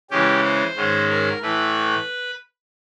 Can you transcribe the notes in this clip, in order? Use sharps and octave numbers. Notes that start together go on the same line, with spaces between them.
C#3 E3 G#3 C#4 G4
C5
G#2 D#3 G#3 C#4
A#4
A2 E3 A3 B4